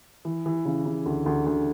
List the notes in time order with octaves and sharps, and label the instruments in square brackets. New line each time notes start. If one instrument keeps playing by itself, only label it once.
[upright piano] E3
E3
C#3
C#3
D2
D2
D2